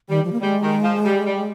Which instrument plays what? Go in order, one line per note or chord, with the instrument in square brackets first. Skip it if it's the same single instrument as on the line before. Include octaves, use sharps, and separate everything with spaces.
[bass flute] D#3 [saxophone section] G3
[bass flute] F3
A#3
[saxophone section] G3 [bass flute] G#3
[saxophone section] D#3
F3
G3
G3